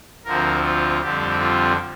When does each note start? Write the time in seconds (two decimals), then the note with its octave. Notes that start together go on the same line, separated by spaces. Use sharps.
0.25 D2 D3 F3 C4 A#4
0.64 F4
1.01 F2 D3 G3 C4 G4
1.40 F4